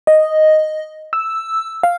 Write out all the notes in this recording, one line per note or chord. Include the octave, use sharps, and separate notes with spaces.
D#5
E6
F5